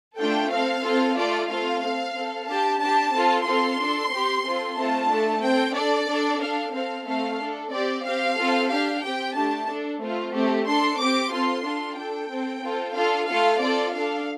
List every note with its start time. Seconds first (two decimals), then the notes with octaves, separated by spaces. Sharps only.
0.18 A3 D4 F4 A4 G5
0.51 C4 A4 F5
0.84 C4 F4 A4
1.17 A3 F4 A4 D5
1.49 A3 C4 F4 A4 F5
1.81 C4 A4
2.15 C4 A4
2.48 D4 G4 A5
2.80 D4 G4 A5
3.12 C4 F4 A4
3.46 C4 F4 A4 C6
3.79 D4 A4
4.12 C4 G4
4.44 C4 F4 A4
4.77 A3 C4 F4 A4 A5
5.09 A3 D4 A4
5.42 C4 A4 G5
5.74 D4 A4 D5
6.08 D4 A4
6.40 D4 A4 F5
6.73 C4 A4 F5
7.06 A3 C4 A4 F5
7.39 D4 A4
7.71 C4 G4 D5
8.04 C4 G4 F5
8.37 C4 F4 A4
8.69 D4 G4 F5
9.02 C4 G4 G5
9.35 A3 D4 G4 A5
9.68 D4 A4
10.00 A3 C4 F4
10.33 A3 C4 G4
10.66 D4 A4 C6
10.98 C4 G4 D6
11.31 C4 F4 A4 C6
11.64 D4 F4 A4
11.97 D4 A4 G5
12.30 C4 A4
12.63 C4 F4 A4
12.95 D4 F4 A4 F5
13.28 A3 F4 A4 F5
13.61 C4 F4 A4 D5
13.93 D4 A4 F5